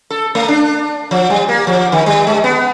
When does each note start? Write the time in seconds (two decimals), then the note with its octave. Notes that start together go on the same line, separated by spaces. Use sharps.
0.10 A4
0.35 A3
0.48 D4
1.11 F3
1.30 G3
1.49 A#3
1.67 F3
1.92 D#3
2.06 G3
2.27 G#3
2.44 B3